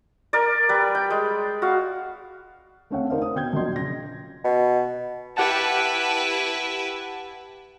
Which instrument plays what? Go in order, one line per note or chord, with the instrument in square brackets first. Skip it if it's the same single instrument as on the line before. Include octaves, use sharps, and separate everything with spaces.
[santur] A#4 D5
G3 B4
G5
G#3
F#4 F5
[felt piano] A3 C4 C#4 C#5 F5 F#5
D#4 A#4 C5 D5 D#5 F5
D#6
B2 G5 G6 G#6
A#1 A#2 F#3 D#5 C6
C#3 A#6
[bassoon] B2
[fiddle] E4 B4 [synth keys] G4 F#5 A5